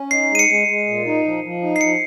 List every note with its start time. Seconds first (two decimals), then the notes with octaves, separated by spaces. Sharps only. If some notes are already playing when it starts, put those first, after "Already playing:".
Already playing: C#4
0.11 D#4 C7
0.30 G#3
0.35 D#7
0.39 C#7
0.49 G#3
0.68 G#3
0.87 A#2
1.06 D#4
1.24 F3
1.44 F3
1.62 D#4
1.76 C7
1.81 F3 C#7